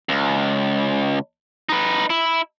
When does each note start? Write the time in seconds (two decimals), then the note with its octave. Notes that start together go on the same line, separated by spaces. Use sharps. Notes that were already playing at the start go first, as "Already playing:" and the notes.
0.09 C#2
1.69 D#4 B4
2.10 E4